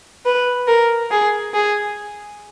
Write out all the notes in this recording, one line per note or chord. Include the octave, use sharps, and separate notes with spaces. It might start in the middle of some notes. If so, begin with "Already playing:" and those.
B4
A#4
G#4
G#4